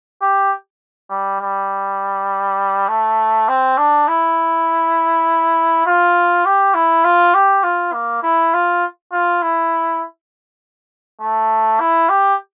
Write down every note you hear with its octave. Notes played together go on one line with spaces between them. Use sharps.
G4
G3
G3
A3
C4
D4
E4
F4
G4
E4
F4
G4
F4
A#3
E4
F4
F4
E4
A3
E4
G4